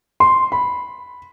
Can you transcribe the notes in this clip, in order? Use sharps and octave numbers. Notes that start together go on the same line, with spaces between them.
C6
B5